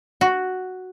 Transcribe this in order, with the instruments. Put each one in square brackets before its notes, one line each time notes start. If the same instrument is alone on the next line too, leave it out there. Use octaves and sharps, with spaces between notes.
[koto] F#4